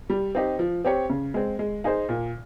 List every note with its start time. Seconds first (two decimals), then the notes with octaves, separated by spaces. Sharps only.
0.10 G3
0.35 C4 D#4 G4
0.59 F3
0.85 C4 G4 C#5
1.10 C#3
1.34 G#3 C4
1.59 G#3
1.84 D#4 G#4 C5
2.09 A#2